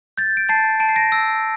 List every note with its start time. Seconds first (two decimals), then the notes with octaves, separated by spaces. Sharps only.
0.18 G6 A6
0.37 D7
0.49 A5 A6 C7
0.80 A5 D7
0.89 C7
0.96 A#6 D7
1.12 E6